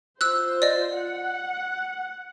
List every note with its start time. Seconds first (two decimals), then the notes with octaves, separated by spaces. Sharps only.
0.21 F4 C5 E6 F#6
0.62 D5 D#5
0.97 F#5